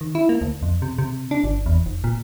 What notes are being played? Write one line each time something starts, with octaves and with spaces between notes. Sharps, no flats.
D#3
E4
A#3
D2
F2
C3
C3
D4
G1
E2
F1
A#2